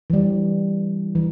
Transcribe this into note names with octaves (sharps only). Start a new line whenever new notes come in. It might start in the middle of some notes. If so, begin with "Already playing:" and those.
E3
G3
E3